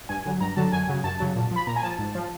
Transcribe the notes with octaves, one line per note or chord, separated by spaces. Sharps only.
G2 G#5
D3 F#3
G2 A#5
D3 F#3 A5
F#2 G#5
C#3 F#3
F#2 A5
C#3 F#3
A#2
F3 B5
A#2 A#5
G#5
F3 A5
G#2
F3